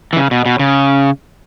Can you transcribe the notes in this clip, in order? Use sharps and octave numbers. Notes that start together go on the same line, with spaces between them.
E3
C#3
B2
B2
C#3